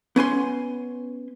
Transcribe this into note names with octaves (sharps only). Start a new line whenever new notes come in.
B3 C#4 G#5 C6